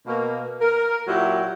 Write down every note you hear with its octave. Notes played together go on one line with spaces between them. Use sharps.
B2 A#3
A#4
A#2 F#3 E4 F#4 G4